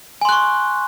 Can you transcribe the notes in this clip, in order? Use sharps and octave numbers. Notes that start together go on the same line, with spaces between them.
G#5 C6 C#6 F#6